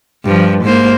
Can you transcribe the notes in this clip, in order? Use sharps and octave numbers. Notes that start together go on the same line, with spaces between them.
G2 F3
G#2 A#3 C5